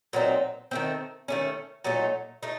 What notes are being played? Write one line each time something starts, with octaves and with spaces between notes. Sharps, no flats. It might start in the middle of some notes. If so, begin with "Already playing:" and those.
A#2 F#3 C4 D#4
D#3 A3 C4
D#3 A3 C#4
A#2 F#3 A3 D#4
A3 D#4